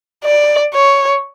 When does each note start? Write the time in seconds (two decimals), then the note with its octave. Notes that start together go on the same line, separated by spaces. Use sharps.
0.24 D5
0.74 C#5